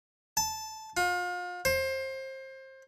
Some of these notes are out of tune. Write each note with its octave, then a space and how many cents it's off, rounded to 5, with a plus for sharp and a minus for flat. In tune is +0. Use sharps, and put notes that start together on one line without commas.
A5 -10
F4 +35
C5 +25